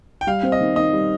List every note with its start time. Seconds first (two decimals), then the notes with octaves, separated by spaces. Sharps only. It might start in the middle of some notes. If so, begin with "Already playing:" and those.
0.21 G5
0.27 G3 F5
0.43 C4
0.52 D#5
0.60 D#3
0.76 D#3 D#5
0.93 G3